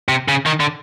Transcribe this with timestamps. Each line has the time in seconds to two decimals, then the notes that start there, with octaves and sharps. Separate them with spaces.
0.09 C3
0.28 C#3
0.46 D#3
0.60 D3